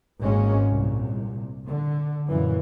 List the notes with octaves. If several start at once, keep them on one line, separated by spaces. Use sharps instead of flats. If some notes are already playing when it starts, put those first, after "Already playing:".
G#1 G#2 G#3 A#3 C#4
C2 A#2
D3
F#2 A#2 E3